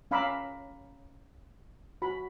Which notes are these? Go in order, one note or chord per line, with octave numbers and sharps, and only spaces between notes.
C#4 F5 A#5 B5 D6 E6
F#4 B5